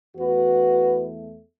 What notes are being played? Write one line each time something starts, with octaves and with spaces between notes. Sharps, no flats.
E2 E3 A3 F#4 B4